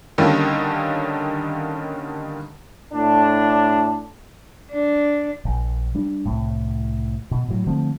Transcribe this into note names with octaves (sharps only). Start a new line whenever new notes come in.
D3 D#3 G3 A#3 C#4 A4
A2 D4
D4
A#1
G3 D4
C2 A2
B2
A2 F#3
D3 F3 A3 C4